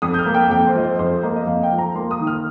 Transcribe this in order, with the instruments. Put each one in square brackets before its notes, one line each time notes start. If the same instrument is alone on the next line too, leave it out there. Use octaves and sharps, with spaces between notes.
[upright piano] F2 D#6
G6
F6
A#3
G5
F2 G5
C5
F3 D#5
C5
F2 C5
A#3 D#5
D#5
F2 F5
G5
F3
A#5
A#3 C6
D#6
D#3
F6